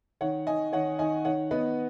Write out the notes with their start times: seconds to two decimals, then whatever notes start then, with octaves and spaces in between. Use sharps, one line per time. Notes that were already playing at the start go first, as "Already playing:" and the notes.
0.21 D#3 C#5 F#5
0.47 D#3 D#5 G#5
0.73 D#3 C#5 F#5
0.99 D#3 D#5 G#5
1.25 D#3 C#5 F#5
1.51 B3 B4 D#5